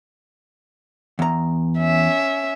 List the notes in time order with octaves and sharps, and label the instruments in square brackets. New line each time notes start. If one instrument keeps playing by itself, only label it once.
[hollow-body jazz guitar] E2 A#5
[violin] C#4 E5